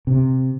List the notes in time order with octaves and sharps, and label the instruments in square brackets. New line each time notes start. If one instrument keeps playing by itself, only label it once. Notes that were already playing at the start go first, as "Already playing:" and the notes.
[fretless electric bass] C3